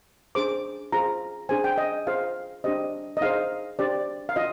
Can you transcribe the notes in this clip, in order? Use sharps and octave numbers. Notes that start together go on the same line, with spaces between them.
D4 G#4 C5 D6
F4 G#4 C5 A#5
D4 G#4 C5 G#5
G5
D#5
F4 G#4 C5 F5
D4 G4 C5 D#5
D#5
D#4 G#4 C5 F5
D4 G4 C5 D5
F5
F4 D#5